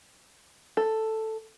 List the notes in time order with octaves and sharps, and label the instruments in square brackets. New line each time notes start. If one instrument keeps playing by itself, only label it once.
[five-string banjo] A4